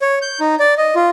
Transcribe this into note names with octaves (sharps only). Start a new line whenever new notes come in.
C#5
G6
D#4
D5
D#5
F4